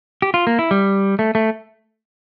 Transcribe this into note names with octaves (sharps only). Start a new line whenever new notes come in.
G4
F4
A#3
E4
G3
A3
A3